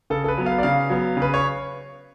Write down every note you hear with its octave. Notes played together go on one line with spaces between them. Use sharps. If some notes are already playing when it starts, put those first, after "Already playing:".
C#3 A4
A4
B4
F#3 B3
F5
D5
C#3 F5
F#3 B3
C#3 B4
C#5